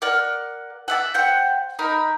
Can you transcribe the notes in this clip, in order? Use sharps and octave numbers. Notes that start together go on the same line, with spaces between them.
A#4 D5 F#5 F6
D5 E5 F#5
C5 F#5 G5
D#4 A#4 B5